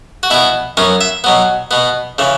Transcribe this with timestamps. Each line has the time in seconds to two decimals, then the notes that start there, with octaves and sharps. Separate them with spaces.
0.23 F#4
0.30 B2 B3 E4
0.77 F#2 F#3 B3 C#4
1.01 E5
1.24 B2 F#3 B3
1.71 B2 B3
2.18 C#3 E3